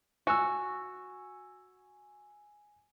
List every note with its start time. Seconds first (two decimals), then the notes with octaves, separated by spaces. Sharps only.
0.27 F#4 G#5 E6